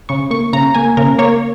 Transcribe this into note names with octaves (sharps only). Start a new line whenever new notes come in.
C#3 C#6
A#3 C#6
C#3 A#5
A#3 G#5
C#3 A#4
A#3 C#5